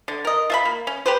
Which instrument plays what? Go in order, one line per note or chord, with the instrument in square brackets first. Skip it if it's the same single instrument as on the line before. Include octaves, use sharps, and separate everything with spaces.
[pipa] D3
A#4 D#5
F4 E5 B5
A#3
C#4
G4 B4 C5